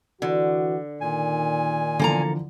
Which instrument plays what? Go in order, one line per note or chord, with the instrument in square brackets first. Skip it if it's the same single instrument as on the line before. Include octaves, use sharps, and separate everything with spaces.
[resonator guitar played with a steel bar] D3 [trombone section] E3 F#4
[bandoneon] A#2 G#5 [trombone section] D#3
[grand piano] D3 E3 F3 [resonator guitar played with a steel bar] A#3 A4 A#5